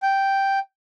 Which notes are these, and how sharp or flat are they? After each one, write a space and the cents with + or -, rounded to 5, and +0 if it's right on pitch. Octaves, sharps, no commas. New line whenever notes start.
G5 -5